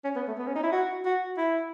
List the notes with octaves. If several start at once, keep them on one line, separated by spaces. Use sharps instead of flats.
C#4
B3
A3
B3
C#4
D#4
E4
F#4
F#4
E4